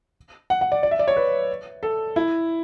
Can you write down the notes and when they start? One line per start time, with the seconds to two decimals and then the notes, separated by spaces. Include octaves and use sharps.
0.50 F#5
0.61 F#5
0.72 D5
0.83 D5
0.91 E5
0.99 D5
1.08 C#5
1.17 B4
1.83 A4
2.16 E4